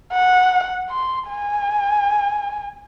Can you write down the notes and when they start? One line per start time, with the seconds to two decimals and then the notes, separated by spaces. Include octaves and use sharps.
0.13 F#5
0.90 C6
1.29 G#5